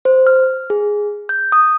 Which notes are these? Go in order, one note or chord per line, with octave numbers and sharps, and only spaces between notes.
C5
F6
G#4
G6
D#6